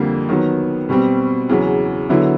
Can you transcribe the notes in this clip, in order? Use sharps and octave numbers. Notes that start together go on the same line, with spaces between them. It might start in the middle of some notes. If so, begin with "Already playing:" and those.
Already playing: F2 D3 G3 A#3
D#3 F#3 B3
B2 G3 C4
E2 C#3 F#3
D3 F#3 B3 E4